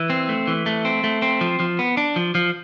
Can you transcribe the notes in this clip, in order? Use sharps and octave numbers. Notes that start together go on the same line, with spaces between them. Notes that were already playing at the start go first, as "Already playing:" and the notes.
Already playing: E3
C4
A3
E3
A3
C4
A3
C4
F3
F3
B3
D4
F3
F3